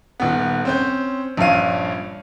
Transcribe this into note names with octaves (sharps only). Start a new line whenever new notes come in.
D#1 B3
C4 C#4 G6
A#1 G2 C#4 F5 D#7